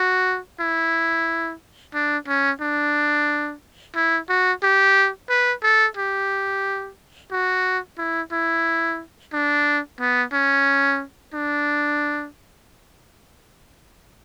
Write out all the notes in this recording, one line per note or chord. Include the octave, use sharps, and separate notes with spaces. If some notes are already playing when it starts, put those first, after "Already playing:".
Already playing: F#4
E4
D4
C#4
D4
E4
F#4
G4
B4
A4
G4
F#4
E4
E4
D4
B3
C#4
D4